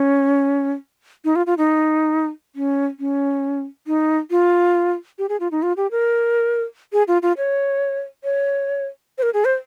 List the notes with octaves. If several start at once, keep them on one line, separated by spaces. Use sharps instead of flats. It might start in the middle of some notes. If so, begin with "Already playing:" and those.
Already playing: C#4
D#4
F4
F4
D#4
C#4
C#4
D#4
F4
G4
G#4
F4
D#4
F4
G4
A#4
G#4
F4
F4
C#5
C#5
C5
A#4
G#4
C5